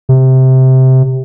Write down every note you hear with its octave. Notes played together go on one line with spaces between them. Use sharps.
C3